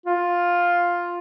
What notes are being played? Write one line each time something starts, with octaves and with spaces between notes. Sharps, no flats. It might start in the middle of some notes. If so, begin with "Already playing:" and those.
F4